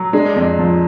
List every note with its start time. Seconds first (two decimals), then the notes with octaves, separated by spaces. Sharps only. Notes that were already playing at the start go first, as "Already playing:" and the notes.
Already playing: F#3
0.13 G#3 D4
0.36 F2
0.59 F3